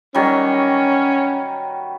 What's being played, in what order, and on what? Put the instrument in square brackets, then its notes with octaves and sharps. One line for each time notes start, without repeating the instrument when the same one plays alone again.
[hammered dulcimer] D#3 F#3 G3 [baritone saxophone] C#4